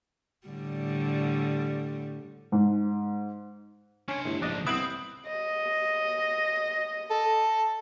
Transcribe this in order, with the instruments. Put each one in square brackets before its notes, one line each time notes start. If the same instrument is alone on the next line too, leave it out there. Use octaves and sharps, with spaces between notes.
[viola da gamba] A2 D3 G3
[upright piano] G#2
[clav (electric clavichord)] C#4 C#5 [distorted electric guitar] D4 C6
[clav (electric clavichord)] G1 [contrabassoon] A2
[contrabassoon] A#1 [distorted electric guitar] G#2 F3 [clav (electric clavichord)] D4 D#5
[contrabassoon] C2 [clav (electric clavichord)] B3 E4 [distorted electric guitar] C4 [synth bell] D#6 F#7
[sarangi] D#5
[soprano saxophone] A4